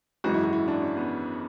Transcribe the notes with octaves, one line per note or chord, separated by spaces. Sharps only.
G#1 F#2 E3 G#3 F#4
E4
F#4
E4
D4
C#4
B3